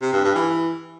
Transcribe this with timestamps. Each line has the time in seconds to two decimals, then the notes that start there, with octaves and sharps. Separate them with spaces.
0.02 C3
0.13 G2
0.24 G2
0.35 E3